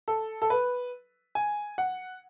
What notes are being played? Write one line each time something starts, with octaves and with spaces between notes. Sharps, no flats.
A4
A4
B4
G#5
F#5